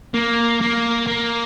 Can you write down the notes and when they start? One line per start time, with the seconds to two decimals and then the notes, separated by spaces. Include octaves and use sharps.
0.14 A#3
0.61 A#3
1.07 A#3